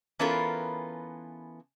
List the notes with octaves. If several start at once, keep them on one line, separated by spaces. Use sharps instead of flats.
E3 B3 C#4 F4 A4 A#4